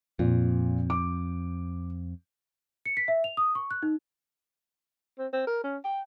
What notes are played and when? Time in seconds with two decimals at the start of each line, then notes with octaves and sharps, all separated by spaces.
0.19 F2 A#2
0.90 D6
2.86 C#7
2.97 B6
3.08 E5
3.24 F7
3.37 D#6
3.55 C#6
3.71 F#6
3.83 D#4
5.18 C4
5.33 C4
5.47 A#4
5.64 C#4
5.85 G5